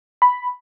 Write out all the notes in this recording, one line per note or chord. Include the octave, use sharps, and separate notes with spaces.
B5